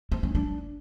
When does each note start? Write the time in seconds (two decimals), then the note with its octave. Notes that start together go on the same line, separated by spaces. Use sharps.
0.12 C4
0.23 C#4
0.35 D4